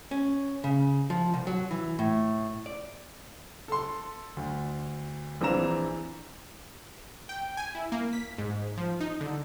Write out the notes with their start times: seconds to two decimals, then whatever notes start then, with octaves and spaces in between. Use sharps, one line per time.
0.11 C#4
0.64 C#3
1.10 F3
1.34 C2
1.47 F#3
1.71 E3
1.99 A2
2.66 D5
3.68 A4 C6
4.37 D2
5.41 A#1 E3 C4 D4 A#5 E7
7.29 G5
7.57 G#5
7.75 E4
7.92 A#3
8.13 B6
8.38 G#2
8.78 F3
9.01 D#4
9.21 D3